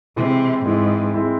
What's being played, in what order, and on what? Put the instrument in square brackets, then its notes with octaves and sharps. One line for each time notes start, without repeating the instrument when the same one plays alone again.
[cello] C3 [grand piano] E3 G#3 C4 E4
[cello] G#2 [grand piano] E3 G#3 C4 E4
[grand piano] E3 G#3 C4 E4